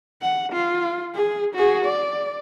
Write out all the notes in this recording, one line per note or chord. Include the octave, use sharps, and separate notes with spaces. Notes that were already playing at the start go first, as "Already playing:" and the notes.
F#5
F4
G#4
F#4 G#4
D5